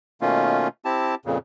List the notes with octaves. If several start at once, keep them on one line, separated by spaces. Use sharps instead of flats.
B2 D#3 A3 A#3 C#4 F4
C4 E4 G4 A5
F2 A#2 C#3